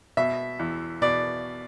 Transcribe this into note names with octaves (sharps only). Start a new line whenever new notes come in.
B2 E5
E2
B2 D5